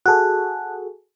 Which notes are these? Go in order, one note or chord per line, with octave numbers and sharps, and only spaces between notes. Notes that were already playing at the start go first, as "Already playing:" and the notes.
F#4 G#4 A4 A5 F#6